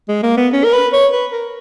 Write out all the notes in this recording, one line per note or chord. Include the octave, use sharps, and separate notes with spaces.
G#3
A#3
B3
C#4
A#4
B4
C#5
B4
A#4